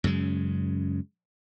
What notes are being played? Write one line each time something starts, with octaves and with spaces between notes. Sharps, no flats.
F#2 C#3 G#3